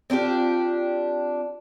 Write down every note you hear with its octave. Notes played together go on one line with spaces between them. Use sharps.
C4 D4 F4 G4